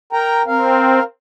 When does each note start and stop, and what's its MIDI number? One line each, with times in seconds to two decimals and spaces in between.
0.13 0.42 70
0.13 0.42 79
0.13 0.42 82
0.47 0.99 60
0.47 1.03 70
0.47 1.03 77